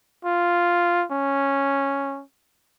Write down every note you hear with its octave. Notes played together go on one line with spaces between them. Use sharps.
F4
C#4